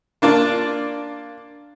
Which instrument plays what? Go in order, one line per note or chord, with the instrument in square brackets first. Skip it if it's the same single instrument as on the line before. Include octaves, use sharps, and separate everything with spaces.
[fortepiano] A#3 D4 F4 D5